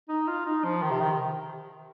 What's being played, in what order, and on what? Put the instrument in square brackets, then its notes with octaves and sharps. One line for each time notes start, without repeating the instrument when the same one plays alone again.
[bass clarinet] D#4
F4
D#4
F3
D#3
C3
D#3